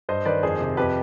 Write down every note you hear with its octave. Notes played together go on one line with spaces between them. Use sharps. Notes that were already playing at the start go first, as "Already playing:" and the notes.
G2 C5 D#5
D#3 B4 D5
F2 G#4 C5
C3
F2 G4 B4